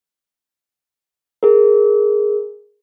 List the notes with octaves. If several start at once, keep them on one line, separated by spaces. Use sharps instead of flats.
G#4 A#4